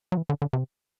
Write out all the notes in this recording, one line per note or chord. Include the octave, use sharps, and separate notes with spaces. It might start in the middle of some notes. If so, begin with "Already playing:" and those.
F#3
E3
D3
D3
C3